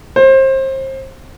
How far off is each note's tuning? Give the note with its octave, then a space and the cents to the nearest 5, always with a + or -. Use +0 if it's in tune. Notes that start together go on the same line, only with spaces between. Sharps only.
C5 +30